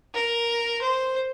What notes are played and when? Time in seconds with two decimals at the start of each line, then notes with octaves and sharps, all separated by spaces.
0.15 A#4
0.82 C5